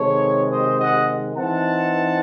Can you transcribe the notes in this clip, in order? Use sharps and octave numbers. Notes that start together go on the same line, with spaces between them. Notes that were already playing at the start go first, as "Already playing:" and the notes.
Already playing: C3 D#3 G#3 A4 C#5
C5 D#5
D#5 F#5
E3 C4 D#4 F#5 A5